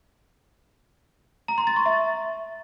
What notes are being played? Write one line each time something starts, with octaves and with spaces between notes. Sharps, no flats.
A#5
C6
A6
C#6
E5